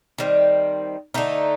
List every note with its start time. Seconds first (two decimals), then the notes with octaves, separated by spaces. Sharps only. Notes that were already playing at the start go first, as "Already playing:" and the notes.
0.18 D#3 G3 C4
1.14 D3 A3 D#4